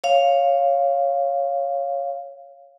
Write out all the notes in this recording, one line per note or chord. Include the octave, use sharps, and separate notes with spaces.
C#5 F5